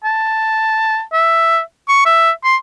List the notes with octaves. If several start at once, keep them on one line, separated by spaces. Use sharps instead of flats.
A5
E5
C#6
E5
C6